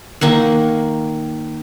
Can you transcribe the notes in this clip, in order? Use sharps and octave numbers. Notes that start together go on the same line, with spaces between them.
D#3 A#3 F#5